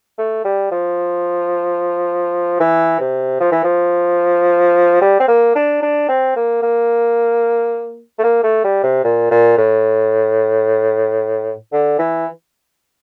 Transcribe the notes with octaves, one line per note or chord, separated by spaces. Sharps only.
A3
G3
F3
E3
C3
F3
E3
F3
G3
C4
A#3
D4
D4
C4
A#3
A#3
A3
A#3
A3
G3
C3
A#2
A#2
A2
D3
E3